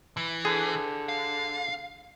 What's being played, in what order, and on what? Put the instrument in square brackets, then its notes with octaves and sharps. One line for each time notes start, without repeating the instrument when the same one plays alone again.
[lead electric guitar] E3
[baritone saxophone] D3 [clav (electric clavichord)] G#4
[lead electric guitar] F5